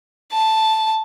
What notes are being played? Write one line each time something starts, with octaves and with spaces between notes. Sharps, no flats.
A5